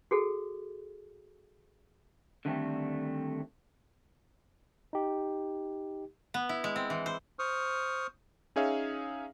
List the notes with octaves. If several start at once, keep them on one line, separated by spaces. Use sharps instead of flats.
F#4 G#4 A4
D3 D#3 G3 A3 C4
D#4 G4
B3
E4
G#3
C4
E3
C5
C5 C#6 D#6 F6
C#4 D#4 G#4 C#5 E5 F5